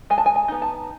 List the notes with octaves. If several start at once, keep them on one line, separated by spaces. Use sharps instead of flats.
G#3 G#5
A5
G#5
G#5
B3 D#4
A5